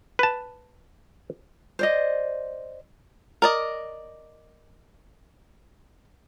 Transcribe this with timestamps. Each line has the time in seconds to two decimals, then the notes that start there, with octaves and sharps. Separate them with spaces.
0.19 B4 A5
1.79 C5 D5 D#5
3.42 A#4 D5 D#5